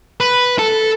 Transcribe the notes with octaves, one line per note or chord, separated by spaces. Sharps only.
B4
A4